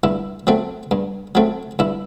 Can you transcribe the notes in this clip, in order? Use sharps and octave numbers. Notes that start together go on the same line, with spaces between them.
G2 E4
F#3 A3 C4
G2
F#3 A3 C4
G2 E4